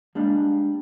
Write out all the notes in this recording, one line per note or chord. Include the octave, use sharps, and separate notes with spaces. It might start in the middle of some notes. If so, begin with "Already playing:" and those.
G3 G#3 A#3 D4